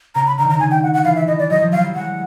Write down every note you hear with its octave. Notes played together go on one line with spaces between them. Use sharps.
C#3 A#5
B5
D3 A#5
D#3
A#5
D3
D#3 G#5
G5
F#5
F#5
E3 F5
E5
E3 D#5
D5
F#3 D#5
F3
F#3 F5
G3
G#3 F#5